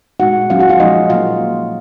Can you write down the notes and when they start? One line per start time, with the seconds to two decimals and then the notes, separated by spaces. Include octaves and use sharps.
0.20 A#2 G#3 D#4 F#4 F#5
0.50 D#3 F#3 C#4 F4 F5
0.59 F#4 F#5
0.69 F4 F5
0.80 F3 G#3 D#4 D#5
1.09 A#2 F#3 A#3 F4 F5